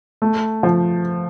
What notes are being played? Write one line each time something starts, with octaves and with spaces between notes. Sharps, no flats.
A3
F3